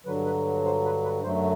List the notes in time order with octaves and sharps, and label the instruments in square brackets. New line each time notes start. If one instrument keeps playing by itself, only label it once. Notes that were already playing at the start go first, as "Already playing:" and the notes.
[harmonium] G2 D3 F#3 B4
B4
C5
B4
B4
F#2 D3 F#3 A3 C5